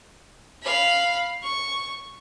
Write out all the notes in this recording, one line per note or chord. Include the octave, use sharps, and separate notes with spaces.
F5 B5
C#6